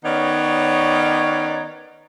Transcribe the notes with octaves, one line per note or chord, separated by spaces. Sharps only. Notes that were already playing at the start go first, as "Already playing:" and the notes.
D#3 B3 C#4 D#4 C#5 D5